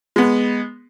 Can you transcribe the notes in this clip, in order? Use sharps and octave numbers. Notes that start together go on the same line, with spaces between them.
G#3 B3